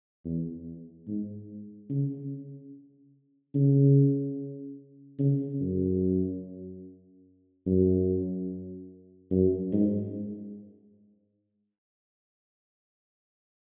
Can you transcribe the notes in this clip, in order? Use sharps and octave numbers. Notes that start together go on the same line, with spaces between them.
E2
G#2
C#3
C#3
C#3
F#2
F#2
F#2
G#2